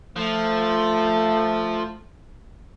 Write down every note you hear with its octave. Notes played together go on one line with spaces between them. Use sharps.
F3 A3